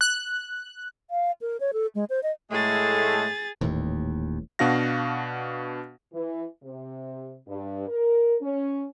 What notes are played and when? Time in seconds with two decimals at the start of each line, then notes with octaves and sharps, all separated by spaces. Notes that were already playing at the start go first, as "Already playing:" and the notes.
0.01 F#6
1.10 F5
1.41 A#4
1.60 C#5
1.73 A4
1.95 G#3
2.10 C5
2.23 D#5
2.51 A2 G#3 A3 G#4 A6
3.61 D#1 D#2 A2 E3
4.59 B2 D4 F#4 F5 A#6
6.13 E3
6.63 C3
7.47 G2
7.88 A#4
8.41 C#4